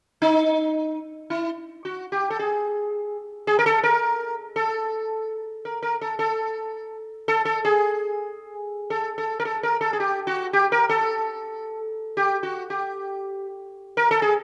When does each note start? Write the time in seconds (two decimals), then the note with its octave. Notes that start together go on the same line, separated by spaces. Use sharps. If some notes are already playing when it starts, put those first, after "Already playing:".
0.22 D#4
1.30 E4
1.85 F#4
2.12 G4
2.30 A4
2.39 G#4
3.47 G#4
3.59 A#4
3.66 A4
3.84 A#4
4.56 A4
5.65 A#4
5.83 A#4
6.01 A4
6.19 A4
7.28 A4
7.45 A4
7.65 G#4
8.90 A4
9.18 A4
9.40 A#4
9.45 A4
9.63 A#4
9.81 A4
9.93 G#4
10.00 G4
10.27 F#4
10.53 G4
10.72 A#4
10.89 A4
12.17 G4
12.43 F#4
12.70 G4
13.97 A#4
14.11 A4
14.22 G#4